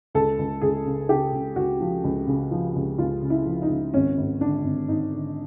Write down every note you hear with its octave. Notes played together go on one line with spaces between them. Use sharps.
C#2 A4
C#2
C#2 G#4
C#3
C#3 G4
C#3
C#2 F#4
F3
C#2
C#3
F3
C#2
C#2 F4
C#3
E4
F3
D#4
C#2
G#1 C#4
G#1
D3 D4
G#1
G#1 D#4
D3